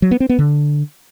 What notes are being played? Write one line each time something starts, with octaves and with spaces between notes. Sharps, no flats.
F#3
B3
C4
B3
D3